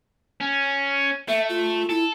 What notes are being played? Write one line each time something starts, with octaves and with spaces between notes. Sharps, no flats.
C#4
A3 E5
F4
E4 A4